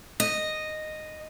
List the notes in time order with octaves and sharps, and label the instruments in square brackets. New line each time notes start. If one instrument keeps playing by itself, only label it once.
[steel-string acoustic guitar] D#5